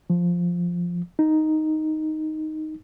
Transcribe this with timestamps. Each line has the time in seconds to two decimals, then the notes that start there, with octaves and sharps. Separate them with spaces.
0.10 F3
1.19 D#4